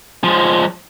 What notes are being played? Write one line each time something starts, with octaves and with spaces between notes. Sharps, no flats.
F3 G#3